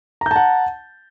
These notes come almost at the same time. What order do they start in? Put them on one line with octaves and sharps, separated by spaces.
A#5 G6 A5 F#5